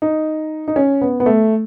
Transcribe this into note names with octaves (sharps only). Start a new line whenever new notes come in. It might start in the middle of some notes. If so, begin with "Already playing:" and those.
D#4
D#4
C#4
B3
B3
A3